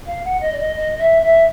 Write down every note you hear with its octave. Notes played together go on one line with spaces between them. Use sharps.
F5
F#5
D#5
D5
D#5
D#5
E5
E5